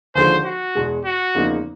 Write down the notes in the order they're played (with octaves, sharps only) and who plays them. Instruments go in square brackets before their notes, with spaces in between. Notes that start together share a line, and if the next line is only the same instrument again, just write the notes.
[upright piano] D#2 D3 F3 G#3 [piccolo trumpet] C5
[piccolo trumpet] F#4
[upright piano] E2 B2 G#3
[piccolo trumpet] F#4
[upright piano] E2 C#3 F3 A#3 D#4